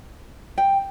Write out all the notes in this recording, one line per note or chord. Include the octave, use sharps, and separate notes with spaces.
G5